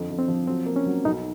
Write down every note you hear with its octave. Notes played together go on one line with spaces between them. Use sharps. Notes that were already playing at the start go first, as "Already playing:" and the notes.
Already playing: F2 D3
F2
C4
F3
F#3 C4
A#3
C#4
F#3
B1 D#4